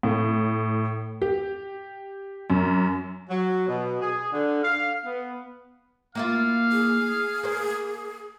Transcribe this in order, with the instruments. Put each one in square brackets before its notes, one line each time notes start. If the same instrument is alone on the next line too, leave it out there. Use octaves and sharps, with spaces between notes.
[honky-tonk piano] A2
G4
F#2
[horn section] F#3
B2
G#4
D3
F5
B3
[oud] A#3 E4 F4 [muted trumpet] F5
[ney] G#4
[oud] A#3 C5